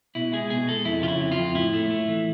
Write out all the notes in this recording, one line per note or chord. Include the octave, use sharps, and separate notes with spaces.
B2 E4
G#3 G#4
B2 G#4
G#3 A4
F2 E4
C#3 F4
E4
F2
F4
F2
A2 E4
A3
A3
E3